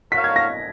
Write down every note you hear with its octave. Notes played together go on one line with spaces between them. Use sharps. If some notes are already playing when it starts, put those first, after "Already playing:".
F#4 A#4 C#5 F5 B6
G#6
A#6